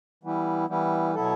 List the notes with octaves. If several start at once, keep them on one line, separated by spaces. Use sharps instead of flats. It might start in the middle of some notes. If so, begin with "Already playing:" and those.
E3 G3 B3 E4
E3 G3 B3 E4
B2 F#3 B3 E4 A4